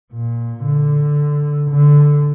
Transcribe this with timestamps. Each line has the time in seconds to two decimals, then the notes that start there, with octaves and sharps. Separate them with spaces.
0.13 A#2
0.65 D3
1.70 D3